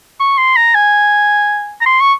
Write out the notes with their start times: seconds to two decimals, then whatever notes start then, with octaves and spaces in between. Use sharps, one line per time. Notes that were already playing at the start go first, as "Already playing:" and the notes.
0.20 C#6
0.38 C6
0.56 A#5
0.75 G#5
1.81 A#5
1.86 C6
2.01 C#6